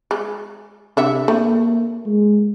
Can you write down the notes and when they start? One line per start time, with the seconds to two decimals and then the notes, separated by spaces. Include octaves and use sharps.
0.11 G#3
0.97 C3 D4 E5 F#5
1.28 A3 A#3
2.06 G#3